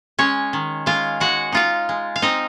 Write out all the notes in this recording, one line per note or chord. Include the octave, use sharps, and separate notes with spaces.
G#3 C#4 C#5
D#3
G#3 F4 F5
G#3 F#4 F#5
D#4 F4 F5
G#3
F5
C4 D#4 D#5